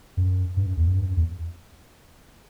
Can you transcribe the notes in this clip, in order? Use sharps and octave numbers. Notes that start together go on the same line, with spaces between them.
F#2
G2
F#2
E2
F#2
G2
F#2
E2